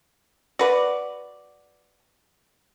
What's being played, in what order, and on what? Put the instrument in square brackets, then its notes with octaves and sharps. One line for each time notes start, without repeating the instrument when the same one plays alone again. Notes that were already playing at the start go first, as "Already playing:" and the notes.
[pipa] F#4 B4 D5